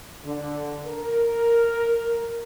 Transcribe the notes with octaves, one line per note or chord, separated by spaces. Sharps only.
D3
A#4